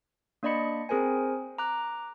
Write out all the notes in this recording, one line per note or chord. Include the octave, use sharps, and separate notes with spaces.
A#3 D4 D5 D#5 B5 C#7
C4 G#4 A#4 C5 G#5
A#5 D6 F#6